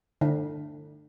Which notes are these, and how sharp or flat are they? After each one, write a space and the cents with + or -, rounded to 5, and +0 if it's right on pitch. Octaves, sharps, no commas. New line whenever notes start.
D3 +25